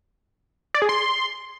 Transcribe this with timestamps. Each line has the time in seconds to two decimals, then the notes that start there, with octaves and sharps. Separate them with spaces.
0.74 D5
0.82 G#4
0.89 C6